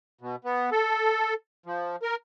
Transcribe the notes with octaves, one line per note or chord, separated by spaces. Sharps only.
B2
B3
A4
F3
A#4